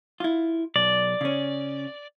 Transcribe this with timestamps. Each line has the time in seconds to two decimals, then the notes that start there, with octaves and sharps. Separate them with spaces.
0.20 E4 F4
0.76 B1 D5
1.21 C#3 C#4